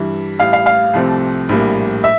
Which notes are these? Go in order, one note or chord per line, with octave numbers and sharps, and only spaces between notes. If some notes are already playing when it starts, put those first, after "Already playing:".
Already playing: G2 E3 G3 E5
A1 A2 G3 F5
F5
F5
C2 C3 F3 A3 C4
A#1 A2 G3 A#3
E5